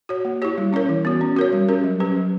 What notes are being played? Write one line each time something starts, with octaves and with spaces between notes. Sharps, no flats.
F#4 C#5
A#3
E4 G4 C#5
G3
C#4 E4 A#4 C#5
E3
B3 F#4
C#4
F#4 A#4 C#5
G3
C#4 G4 A#4
F#3
C#4 G4 B4
F#3